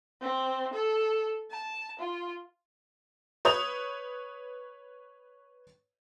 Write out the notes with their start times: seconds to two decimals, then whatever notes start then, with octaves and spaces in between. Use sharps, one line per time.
0.22 C4
0.73 A4
1.51 A5
1.99 F4
3.45 B4 C#5 D#6 G6 F7